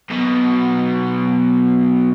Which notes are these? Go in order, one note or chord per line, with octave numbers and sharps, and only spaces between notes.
B1 B2